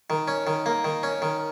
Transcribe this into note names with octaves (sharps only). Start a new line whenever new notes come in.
D#3
C#4
D#3
A#3
D#3
C#4
D#3